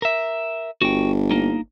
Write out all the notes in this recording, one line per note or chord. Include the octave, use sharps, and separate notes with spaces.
A#4 E5
G1 F#4 G5
A#3 D#4